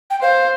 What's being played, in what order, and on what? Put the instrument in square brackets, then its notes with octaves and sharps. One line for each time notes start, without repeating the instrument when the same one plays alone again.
[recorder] G5
[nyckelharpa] C5 [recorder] F5